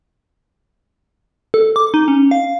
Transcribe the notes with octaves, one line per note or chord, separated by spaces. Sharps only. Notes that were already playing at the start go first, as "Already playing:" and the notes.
A4
D6
D#4
C#4
F5